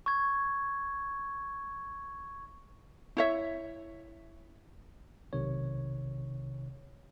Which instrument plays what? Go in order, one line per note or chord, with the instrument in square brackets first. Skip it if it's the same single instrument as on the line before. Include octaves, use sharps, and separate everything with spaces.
[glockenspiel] C#6 G#6
[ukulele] E4 C#5 E5
[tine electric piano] B1 C3 D#3 C#5